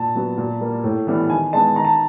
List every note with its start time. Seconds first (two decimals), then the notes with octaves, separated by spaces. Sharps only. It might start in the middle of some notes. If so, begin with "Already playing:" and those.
Already playing: A#2 A5
0.15 F#3 B3
0.38 A#2
0.61 G3 A#3
0.84 A2
1.07 E3 G3 B3
1.30 D#3 G#5
1.53 G#3 B3 A5
1.76 D#3 A#5
1.85 A5